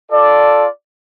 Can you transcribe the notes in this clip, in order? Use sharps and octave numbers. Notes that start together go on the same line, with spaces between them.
F4 A4 D5